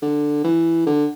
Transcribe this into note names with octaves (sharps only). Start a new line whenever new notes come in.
D3
E3
D3